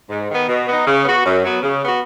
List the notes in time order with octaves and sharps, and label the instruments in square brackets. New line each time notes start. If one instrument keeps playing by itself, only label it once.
[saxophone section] G#2
D#3 B3
B2
B3 D#4
C#3
B3 F#4
F#2
F#3 B3 F#4
C#3
B3 F#4